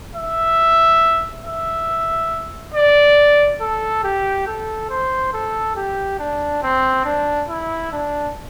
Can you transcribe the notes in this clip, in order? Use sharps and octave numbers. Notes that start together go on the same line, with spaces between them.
E5
E5
D5
A4
G4
A4
C5
A4
G4
D4
C4
D4
E4
D4